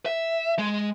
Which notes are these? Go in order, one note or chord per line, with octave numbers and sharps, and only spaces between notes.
E5
G#3